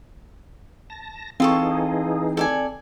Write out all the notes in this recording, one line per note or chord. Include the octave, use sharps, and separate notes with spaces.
A5 A#6
E3 C4 D#4 F4 G#4 A4 C#6
A4 D5 G#5